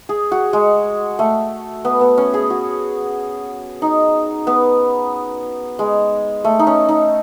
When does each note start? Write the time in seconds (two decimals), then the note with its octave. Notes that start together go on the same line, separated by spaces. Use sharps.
0.09 G#4
0.32 F#4
0.53 G#3
1.19 A3
1.85 B3
2.01 B3
2.18 C#4
2.34 G#4
2.50 F#4
3.82 D#4
4.47 B3
5.79 G#3
6.44 A3
6.59 D#4
6.67 C#4
6.89 D#4